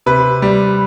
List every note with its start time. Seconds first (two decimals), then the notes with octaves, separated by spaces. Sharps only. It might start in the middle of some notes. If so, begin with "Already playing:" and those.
0.06 C3 B4
0.42 G3